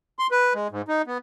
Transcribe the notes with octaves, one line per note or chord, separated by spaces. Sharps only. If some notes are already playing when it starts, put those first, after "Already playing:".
C6
B4
G#3
G#2
D#4
B3